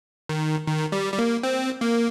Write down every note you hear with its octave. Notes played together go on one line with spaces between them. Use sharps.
D#3
D#3
G3
G3
A#3
C4
A#3